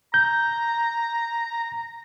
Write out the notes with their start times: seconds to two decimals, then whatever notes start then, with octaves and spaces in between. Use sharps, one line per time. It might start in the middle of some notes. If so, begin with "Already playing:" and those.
0.14 A#5 G6